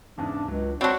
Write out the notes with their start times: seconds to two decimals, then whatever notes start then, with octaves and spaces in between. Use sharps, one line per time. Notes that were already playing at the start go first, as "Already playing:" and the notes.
0.18 E2 G#2 C#3 D4
0.48 C#2 F#3
0.81 C4 D4 F#4 C#5 D5 F#5 B5